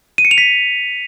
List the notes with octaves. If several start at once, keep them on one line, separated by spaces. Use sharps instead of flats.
D#7
C#7
F7
B6